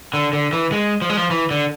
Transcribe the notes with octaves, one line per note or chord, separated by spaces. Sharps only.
D3
D3
E3
G#3
F3
G#3
F3
E3
D3